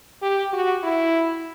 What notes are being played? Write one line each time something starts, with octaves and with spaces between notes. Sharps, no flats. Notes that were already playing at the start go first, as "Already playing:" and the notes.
G4
F#4
E4